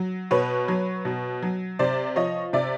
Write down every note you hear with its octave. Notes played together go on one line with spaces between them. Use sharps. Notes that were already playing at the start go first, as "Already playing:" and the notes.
Already playing: F#3
B2 B4 C#5
F#3
B2
F#3
C3 C5 D5
F3 C#5 D#5
C3 D5 E5